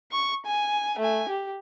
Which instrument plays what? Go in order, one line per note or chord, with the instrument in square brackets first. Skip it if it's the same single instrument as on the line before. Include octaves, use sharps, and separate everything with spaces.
[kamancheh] C#6
G#5
A3 G#5
G4